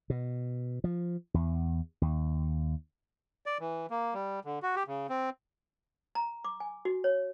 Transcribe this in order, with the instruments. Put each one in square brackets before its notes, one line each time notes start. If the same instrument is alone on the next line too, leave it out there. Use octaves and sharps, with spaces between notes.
[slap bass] B2
F3
E2
D#2
[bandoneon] D5
E3
A#3
G3
D3
F#4
G4
C#3
C4
[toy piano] A#5
D6
G#5
F#4
C#5